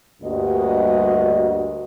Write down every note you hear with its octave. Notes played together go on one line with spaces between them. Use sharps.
D2 G2 G3 A#3 F#4 D#5